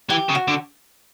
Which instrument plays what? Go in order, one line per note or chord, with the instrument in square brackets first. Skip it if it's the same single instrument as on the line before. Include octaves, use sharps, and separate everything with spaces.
[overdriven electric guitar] E3 [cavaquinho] G4
[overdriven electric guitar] C#3
[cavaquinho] F#4
[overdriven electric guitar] D3